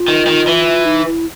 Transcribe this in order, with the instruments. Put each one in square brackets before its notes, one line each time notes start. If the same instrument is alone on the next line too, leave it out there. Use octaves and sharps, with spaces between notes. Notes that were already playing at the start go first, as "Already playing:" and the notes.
Already playing: [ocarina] F4
[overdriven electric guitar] D#3
D#3
E3
[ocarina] D#4
E4